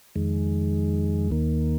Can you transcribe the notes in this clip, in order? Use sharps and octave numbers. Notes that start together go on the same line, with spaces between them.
F2 D#3 G#3
D#2 D#3 A#3